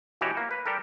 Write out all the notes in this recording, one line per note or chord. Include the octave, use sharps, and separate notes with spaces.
B2 E3 F#4 G4 C#5
A#3
B4
G3 G4 A4 A#4